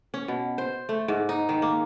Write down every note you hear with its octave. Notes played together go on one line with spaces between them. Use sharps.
C#4
B2
C5
A3
G#2
D#4
D#3
A#3